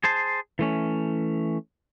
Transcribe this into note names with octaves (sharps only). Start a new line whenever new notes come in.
G#4 C5 A5
E3 A3 C#4